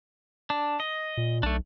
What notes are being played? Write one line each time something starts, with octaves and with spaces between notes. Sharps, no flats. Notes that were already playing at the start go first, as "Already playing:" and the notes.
D4
D#5
A#2
B1 A3 D4